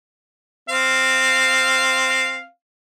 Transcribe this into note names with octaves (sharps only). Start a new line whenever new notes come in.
C4 F5